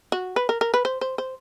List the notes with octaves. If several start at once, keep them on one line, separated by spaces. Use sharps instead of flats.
F#4
B4
A#4
A#4
B4
C5
C5
C5